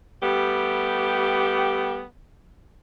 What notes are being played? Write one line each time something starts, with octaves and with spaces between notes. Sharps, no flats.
G3 A3 B3 G4